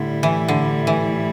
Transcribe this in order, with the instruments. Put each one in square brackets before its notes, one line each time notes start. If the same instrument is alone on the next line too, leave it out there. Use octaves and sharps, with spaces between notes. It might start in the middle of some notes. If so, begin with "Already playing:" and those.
Already playing: [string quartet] A2 G3 E4 [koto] D3
[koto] E3
D3
E3